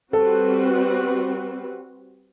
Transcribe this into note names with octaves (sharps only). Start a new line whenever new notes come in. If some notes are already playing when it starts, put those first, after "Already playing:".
G3 C4 F#4 A4 B4